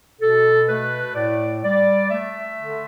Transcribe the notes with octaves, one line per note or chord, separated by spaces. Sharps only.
B2 A4
A3 B4
A2 D5
G3 D5
A3 E5
D3